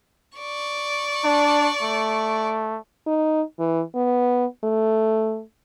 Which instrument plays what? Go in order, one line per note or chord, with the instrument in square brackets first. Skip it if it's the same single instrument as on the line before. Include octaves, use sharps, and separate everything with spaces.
[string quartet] D5 C#6
[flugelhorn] D4
A3
[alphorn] D#4
E3
B3
A3